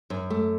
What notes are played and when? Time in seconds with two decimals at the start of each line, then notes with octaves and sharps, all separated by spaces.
0.10 F#2
0.30 A3